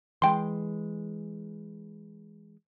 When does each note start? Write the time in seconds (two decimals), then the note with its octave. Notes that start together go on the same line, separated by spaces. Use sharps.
0.22 E3 G#3 G5 C6